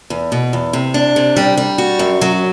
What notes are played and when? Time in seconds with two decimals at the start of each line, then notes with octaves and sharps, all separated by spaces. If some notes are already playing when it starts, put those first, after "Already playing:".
0.10 E2
0.32 B2
0.53 E2
0.73 C3
0.94 D4
1.16 C3
1.36 G3
1.57 G3
1.78 F#4
1.99 F#2
2.21 F#3